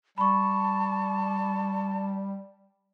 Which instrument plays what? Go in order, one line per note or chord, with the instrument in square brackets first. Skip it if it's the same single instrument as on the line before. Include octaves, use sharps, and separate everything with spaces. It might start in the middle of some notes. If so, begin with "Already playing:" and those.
[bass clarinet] G3 [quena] A5 [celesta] B5 C#6